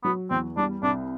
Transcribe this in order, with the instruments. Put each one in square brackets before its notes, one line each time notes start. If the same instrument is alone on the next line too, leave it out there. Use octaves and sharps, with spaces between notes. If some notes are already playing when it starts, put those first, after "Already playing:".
[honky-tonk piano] F#3 [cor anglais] B3
[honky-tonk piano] E2 [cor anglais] C4
[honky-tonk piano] G3 [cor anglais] D4
[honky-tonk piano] C2 [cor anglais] D4